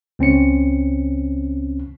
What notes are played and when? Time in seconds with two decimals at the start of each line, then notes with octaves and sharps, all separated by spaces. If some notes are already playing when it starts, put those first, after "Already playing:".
0.19 C#2 C4 C#4 C#7